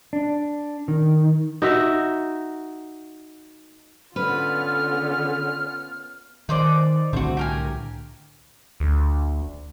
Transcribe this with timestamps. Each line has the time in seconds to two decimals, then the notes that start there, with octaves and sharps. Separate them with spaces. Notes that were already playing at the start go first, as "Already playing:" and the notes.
0.13 D4
0.88 D#3
1.62 D#4 F#4 E5
4.16 D3 B3 C#4 F4 B4 F6
6.49 D#3 D#4 C5 D5
7.13 C2 A2 D3 C4 F#4
7.37 G4 A#4 G#5
8.80 D2